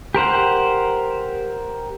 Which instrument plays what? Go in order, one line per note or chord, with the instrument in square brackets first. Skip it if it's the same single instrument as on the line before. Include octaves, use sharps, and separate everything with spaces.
[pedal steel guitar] G4 A#4 C5 F#5